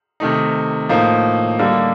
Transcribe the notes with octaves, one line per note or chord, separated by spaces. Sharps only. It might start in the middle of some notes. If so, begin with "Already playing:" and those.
C3 D#3 A3 D#4
A2 F3 A#3 D#4
D3 G3 A#3 D#4